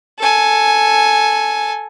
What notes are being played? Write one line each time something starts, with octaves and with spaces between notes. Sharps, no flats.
A4 G#5